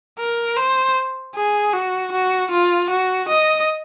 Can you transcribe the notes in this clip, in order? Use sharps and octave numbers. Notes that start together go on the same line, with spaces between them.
A#4
C5
G#4
F#4
F#4
F4
F#4
D#5